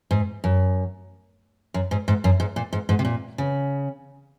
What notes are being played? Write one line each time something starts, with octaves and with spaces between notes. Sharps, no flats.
G#2
F#2
F#2
G#2
G#2
F#2
G#2
A#2
G#2
G#2
C3
A#2
C#3